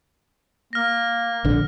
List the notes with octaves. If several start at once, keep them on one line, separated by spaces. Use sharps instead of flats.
A#3 F6 A#6
A#1 D3